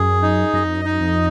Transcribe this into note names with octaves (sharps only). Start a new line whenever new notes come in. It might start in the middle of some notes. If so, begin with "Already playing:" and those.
Already playing: F#2 G#4
D#4
F#2 D#5
F2
F#2
D#4
F2